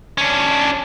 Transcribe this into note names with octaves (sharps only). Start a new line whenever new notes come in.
C#4 D4